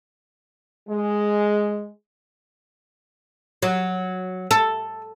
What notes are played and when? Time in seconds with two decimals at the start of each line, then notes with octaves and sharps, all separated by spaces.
0.89 G#3
3.62 F#3
4.51 A4